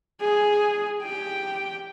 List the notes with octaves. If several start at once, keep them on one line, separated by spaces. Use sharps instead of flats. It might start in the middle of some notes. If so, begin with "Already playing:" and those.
G#4
G4 G5